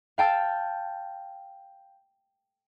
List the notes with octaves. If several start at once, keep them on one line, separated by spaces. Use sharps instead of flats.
F5 G5 A5 E6